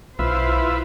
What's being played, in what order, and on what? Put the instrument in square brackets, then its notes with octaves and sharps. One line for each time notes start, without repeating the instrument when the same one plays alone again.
[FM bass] B1 [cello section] E4 C5 [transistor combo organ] F4 B4 E5